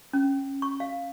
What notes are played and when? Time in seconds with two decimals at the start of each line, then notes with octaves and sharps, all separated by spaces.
0.13 C#4
0.62 C#6
0.80 F5